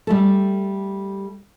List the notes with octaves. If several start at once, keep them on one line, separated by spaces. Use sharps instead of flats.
G3 A3 A4